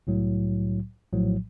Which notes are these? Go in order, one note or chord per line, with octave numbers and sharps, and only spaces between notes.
C2 A2 F#3
A#1 A2 F3 F#3